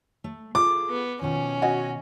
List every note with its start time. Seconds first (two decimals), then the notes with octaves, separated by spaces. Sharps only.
0.24 A3
0.55 F4 G#4 A4 D6
0.89 B3
1.21 B2 D#3 F3 C#4
1.62 F#4 D#5 G#5